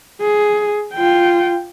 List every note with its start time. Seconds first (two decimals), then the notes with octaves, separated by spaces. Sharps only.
0.22 G#4
0.94 F4 G5